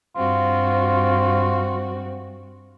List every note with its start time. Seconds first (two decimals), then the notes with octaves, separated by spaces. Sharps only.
0.15 G2 C4 F4 F#4